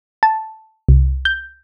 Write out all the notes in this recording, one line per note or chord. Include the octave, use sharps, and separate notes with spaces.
A5
C2
G6